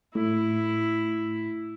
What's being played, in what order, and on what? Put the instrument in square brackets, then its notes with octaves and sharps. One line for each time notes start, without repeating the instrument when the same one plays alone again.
[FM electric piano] A2 [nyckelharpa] E4